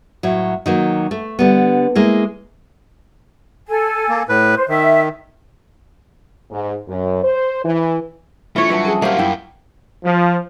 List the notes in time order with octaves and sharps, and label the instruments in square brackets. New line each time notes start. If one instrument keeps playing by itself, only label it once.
[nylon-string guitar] A2 F#3
D#3 F#3 A#3
A3
D3 G3 B3
G#3 A#3 E4
[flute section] A4 G#5
[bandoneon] A#3
A2 B4
[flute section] C5
[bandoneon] D#3 [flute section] E5
[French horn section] G#2
F#2
C5
E3
[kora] E3 C#5 [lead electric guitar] A3 [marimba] D4 F4
[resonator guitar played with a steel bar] A2 B4 E5 [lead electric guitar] F#3 [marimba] G3
[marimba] C#4 [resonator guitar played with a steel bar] G#4 A4
[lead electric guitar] F#3 F4 [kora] A#3 [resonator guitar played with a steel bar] G4 C5 E5 [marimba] F#5 F6
[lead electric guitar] F#2 [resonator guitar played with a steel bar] E4 G5
[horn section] F3